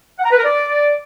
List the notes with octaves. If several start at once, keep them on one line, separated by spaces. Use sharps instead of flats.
F#5
A#5
B4
A#4
D5